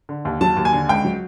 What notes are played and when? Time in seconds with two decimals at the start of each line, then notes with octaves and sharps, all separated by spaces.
0.09 D3
0.25 D#2
0.41 F#3 A5
0.56 D#2
0.65 G#5
0.73 D3
0.89 C#2 G5
1.05 F#3